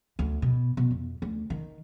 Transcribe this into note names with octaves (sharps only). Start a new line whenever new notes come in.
D2
B2
B2
F2
D2
D#3